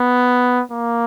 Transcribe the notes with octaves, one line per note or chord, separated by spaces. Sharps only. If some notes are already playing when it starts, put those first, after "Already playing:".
Already playing: B3
A#3